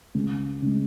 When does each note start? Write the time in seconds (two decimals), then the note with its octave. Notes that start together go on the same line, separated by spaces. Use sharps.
0.15 C#2
0.62 C#3 G#3